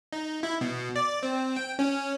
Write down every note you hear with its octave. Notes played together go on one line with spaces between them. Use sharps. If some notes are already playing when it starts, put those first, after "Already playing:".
D#4
E4
B2
D5
C4
G5
C#4